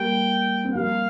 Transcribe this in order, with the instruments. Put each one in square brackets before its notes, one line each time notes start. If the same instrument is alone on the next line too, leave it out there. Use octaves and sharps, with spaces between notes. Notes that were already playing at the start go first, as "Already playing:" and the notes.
Already playing: [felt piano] G3 A#3 [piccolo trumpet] G5
[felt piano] C4
[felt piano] G3 A#3 [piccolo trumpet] F5